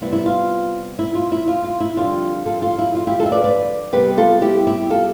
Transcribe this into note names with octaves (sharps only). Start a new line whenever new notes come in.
C3 G3 B3 E4
E4
F4
E4
F4
E4
F4
F4
E4
F2 D3 G3 D4 F4
F4 A4
F4
E4
F4
E4 G4
F4 A4
E5
B4 D5
B4 D5
C3 G3 B3 G4 B4
F4 A4
E4 G4
E4 G4
F4 A4